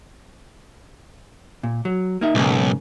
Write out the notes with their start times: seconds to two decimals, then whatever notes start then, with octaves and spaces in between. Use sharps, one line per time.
1.63 A#2
1.85 F#3
2.21 A#3 D#4 E5
2.35 B1 G#2 C#3 A#3